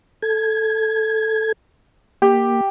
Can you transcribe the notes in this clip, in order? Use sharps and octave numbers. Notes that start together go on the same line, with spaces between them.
A4 G#6
A#3 G4